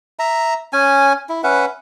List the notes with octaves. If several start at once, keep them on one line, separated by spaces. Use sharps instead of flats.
E5 A#5
C#4 G#5
E4
C#4 B4 E5 F#5